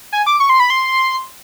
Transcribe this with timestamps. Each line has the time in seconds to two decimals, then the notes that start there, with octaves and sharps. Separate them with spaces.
0.12 G#5
0.26 D6
0.40 C#6
0.49 C6
0.60 B5
0.70 C6